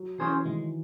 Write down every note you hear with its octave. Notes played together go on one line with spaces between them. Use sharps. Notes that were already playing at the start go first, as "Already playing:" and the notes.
Already playing: F#3
E3 C#4 G#4 C5
D#3 G#3